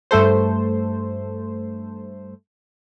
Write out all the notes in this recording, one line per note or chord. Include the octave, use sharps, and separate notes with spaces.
G2 A3 A4 C5